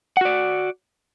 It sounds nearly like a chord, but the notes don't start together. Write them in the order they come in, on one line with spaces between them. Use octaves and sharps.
F#5 F#4 D5